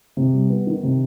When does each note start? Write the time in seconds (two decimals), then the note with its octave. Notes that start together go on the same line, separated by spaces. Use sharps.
0.17 C3
0.33 G3
0.50 B3
0.67 D#3
0.83 C3